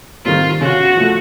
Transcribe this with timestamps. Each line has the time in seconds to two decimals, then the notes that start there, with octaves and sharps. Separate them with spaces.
0.25 D#3 G3 C4 F4
0.61 C#3 F#4
0.97 F3 A3